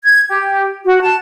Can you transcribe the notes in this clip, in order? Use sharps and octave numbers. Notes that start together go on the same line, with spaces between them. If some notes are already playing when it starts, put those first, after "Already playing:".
G#6
G4
F#4
A5